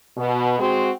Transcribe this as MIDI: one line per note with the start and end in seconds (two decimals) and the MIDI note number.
0.16 0.58 47
0.59 0.90 56
0.59 0.90 60
0.59 0.90 66